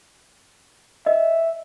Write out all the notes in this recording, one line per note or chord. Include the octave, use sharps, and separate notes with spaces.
D#5 E5